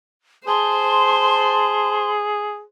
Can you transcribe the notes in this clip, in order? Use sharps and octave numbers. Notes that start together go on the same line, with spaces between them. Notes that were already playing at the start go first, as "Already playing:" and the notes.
G#4 C5 A5 C6